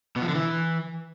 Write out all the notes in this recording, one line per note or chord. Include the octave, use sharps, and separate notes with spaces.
B2
F3
D3
E3